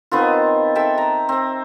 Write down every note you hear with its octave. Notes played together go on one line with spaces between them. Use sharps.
D#3 B3 C4 F4
A4 E5 G5 A5
A#5
C4